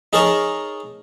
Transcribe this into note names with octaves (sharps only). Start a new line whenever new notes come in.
D#4 G#4 A#4 C#5 A5 A#5